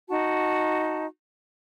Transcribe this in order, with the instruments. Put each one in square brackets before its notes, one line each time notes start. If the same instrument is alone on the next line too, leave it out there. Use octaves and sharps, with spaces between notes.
[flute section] D#4 F#4 A5